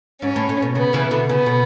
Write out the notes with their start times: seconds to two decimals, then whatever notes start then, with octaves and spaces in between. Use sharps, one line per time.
0.22 G#2 C#4
0.36 A2
0.49 A2
0.62 B2
0.75 C#3 B3
0.93 C#3 E3
1.11 B2 D3
1.29 C#3 B3
1.46 B2